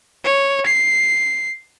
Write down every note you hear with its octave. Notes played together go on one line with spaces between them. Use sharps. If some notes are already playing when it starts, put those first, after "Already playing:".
C#5
C7